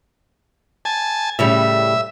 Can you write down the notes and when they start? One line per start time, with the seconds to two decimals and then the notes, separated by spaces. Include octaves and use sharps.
0.85 G#5 A5
1.39 A2 C#3 G3 E5